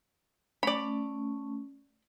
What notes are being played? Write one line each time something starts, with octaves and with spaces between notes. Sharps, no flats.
A3 C#4 D5 B5